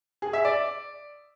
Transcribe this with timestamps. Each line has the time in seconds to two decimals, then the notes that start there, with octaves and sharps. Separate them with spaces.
0.22 G#4
0.33 E5
0.45 D5